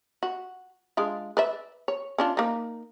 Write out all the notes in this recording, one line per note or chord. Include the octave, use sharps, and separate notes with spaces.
F#4
G#3 D4 F4
B4 D5 E5
C#5
C#4 D4 F4
A#3 D#4